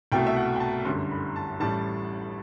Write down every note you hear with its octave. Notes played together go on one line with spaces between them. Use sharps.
C2 B2 A3 G5
E5
F#5
G5
A5
G1 F#2 D3 G3 C6
B5
A5
A1 A2 G3 A5